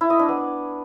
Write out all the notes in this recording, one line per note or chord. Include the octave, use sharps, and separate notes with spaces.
E4
D#5
D4
B3